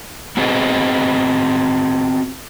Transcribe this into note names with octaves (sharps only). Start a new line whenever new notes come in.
B3 C4 F#4 G#4 B4 D#5